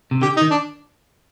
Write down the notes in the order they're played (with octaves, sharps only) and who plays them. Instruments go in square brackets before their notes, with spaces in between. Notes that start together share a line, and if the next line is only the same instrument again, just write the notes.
[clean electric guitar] C3
[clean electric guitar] D3 [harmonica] G4
[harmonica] D#4
[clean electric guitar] D#3
[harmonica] D4